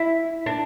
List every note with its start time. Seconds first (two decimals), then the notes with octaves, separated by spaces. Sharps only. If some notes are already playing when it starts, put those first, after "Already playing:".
Already playing: E4
0.46 D4